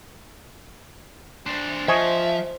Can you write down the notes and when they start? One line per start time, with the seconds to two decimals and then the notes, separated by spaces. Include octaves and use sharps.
1.46 D4 C5
1.88 F3 C5 D#5 E5 G#5 C#6